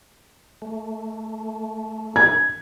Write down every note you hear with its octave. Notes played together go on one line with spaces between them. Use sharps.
A3
G#6